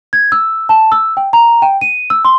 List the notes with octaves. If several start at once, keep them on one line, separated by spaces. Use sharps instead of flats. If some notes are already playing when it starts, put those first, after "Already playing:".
G#6
E6
A5
E6
G5
A#5
G5
D#7
E6
C6